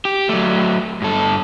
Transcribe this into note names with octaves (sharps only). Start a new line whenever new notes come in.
G4
F#3 A3
G2 A4